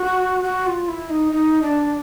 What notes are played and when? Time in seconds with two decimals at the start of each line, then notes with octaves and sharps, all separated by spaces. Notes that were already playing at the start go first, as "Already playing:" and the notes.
Already playing: F#4
0.44 F#4
0.66 F4
0.88 E4
1.10 D#4
1.32 D#4
1.62 D4